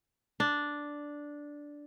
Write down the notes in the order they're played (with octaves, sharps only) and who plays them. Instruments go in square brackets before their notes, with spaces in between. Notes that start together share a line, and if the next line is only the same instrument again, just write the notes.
[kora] D4